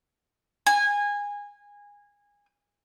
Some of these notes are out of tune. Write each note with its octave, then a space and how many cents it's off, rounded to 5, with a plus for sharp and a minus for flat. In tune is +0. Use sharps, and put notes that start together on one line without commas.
G#5 -20